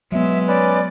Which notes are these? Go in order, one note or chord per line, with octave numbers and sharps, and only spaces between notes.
F#3 G#3 B3 E5
C#4 B4 D5